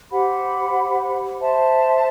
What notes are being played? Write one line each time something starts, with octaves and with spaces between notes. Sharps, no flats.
G4 C5 F#5 B5
C5 E5 A5